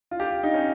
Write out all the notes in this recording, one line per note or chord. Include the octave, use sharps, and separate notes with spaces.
F4
G4
F4
D#4
C#4